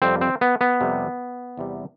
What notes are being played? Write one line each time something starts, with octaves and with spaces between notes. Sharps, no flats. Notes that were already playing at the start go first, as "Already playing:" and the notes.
F2 C3 G3 C4
C4
B3
B3
F2 C3 G3
E2 C3 G3